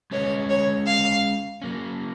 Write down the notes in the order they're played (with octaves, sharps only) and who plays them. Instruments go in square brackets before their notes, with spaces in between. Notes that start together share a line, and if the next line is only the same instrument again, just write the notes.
[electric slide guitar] G#3 C#4 G#4 B4 D#5 [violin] C#5
[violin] C#5
F5
[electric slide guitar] F#3 A#3 C#4